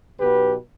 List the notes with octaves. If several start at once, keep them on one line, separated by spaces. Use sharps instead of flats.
B1 B2 B3 G4 B4